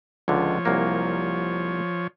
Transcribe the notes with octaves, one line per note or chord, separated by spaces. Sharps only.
C#2 D3 F3 C#5
C2 F#3 A#3